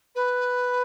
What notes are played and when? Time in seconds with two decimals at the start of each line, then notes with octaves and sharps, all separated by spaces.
0.15 B4